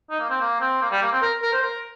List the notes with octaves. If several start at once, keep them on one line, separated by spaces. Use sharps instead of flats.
D#4
A#3
C4
A#3
C4
A#3
G3
A#3
C4
A#4
A#4
C5
A#4